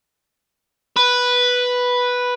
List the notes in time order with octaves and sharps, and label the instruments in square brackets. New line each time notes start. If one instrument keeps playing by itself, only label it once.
[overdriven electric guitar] B4